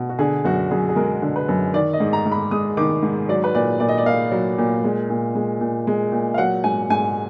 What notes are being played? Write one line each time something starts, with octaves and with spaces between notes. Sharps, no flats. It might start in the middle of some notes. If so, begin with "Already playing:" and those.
Already playing: B2
F#4
D3 G#4
F#2 F#4
F#2 G#4
G#4
G#3 A#4
D3
B4
F#2
D#3 D5
D#5
G#2
A#5
G#2
B5
G#3 D#6
D#3 D6
G#2
F#3 D5
B4
A#2 D5
A#2 D5
D#5
D5
A#3 F5
F#3
A#2
G#3
A#2
G#3
A#2
G#3
A#2
F5
F#3 F#5
G#2 G#5
G#2 G#5